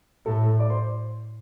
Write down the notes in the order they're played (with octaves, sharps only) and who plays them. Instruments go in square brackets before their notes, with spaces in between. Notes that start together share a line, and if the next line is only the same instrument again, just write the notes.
[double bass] A2 [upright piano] A4 A5
[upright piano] D5 D6
C5 C6